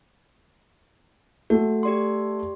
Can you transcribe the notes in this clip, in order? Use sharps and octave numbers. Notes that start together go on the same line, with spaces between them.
A3 F#4
G4 D5 C6